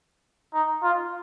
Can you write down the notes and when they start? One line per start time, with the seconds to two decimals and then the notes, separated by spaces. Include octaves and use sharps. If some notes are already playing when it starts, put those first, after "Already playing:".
0.53 D#4
0.83 F4